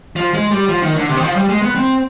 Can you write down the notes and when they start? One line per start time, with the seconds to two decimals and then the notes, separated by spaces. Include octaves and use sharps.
0.16 F3
0.34 G#3
0.52 G3
0.69 F3
0.83 D#3
0.96 D3
1.09 C3
1.17 D#3
1.23 F3
1.36 G3
1.49 G#3
1.62 B3
1.75 C4